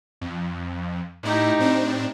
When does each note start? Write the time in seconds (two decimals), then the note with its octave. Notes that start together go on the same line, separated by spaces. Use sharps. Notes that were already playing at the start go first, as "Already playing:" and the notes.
0.21 F2
1.23 A2 D#4 E4 G4
1.58 A2 C4 D4